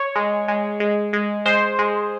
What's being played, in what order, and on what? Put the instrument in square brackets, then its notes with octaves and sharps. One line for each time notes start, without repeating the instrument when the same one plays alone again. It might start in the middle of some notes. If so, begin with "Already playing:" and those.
Already playing: [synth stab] C#5
G#3
G#3
G#3
G#3
G#3 C5
G#3